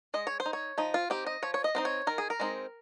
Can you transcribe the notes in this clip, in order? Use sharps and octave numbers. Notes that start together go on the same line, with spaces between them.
G#3 D#5
C#5
C5
D#4
C#5
F3 D#4
F4
C4 D#4 G4
D#5
F3 C#5
C#5
D#5
C4 D#4 C5
C#5
D#3 A#4
G#4
A#4
G#3 C4 D#4